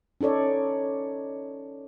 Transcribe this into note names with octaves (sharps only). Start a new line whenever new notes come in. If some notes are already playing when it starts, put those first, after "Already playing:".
C#4 D#4 A4 C#5 D5